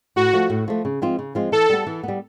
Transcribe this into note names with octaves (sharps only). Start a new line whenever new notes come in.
A2 F#4
F3 A3
A2
F3 A3
C#3
F3 G#3 C4 F4
C#3
F3 G#3 C4 F4
E3 A4
G3 B3
E3
G3 B3